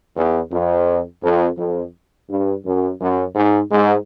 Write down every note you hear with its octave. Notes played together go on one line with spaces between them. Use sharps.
E2
F2
F2
F2
G2
F#2
F#2
G#2
G#2